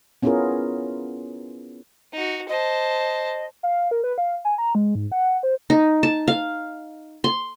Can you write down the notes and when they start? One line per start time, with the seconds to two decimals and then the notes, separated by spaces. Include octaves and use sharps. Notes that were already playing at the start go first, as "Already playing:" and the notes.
0.23 B3 C#4 E4 F4 G#4 A#4
2.13 D#4 F#4
2.49 C5 D#5 A5
3.63 F5
3.91 A#4
4.04 B4
4.18 F5
4.45 G#5
4.58 A#5
4.75 G#3
4.95 G#2
5.12 F#5
5.43 C5
5.70 D#4
6.03 A5
6.28 F5
7.24 C6